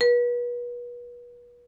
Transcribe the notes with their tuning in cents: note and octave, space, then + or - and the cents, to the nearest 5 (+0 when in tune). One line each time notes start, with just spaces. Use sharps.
B4 -35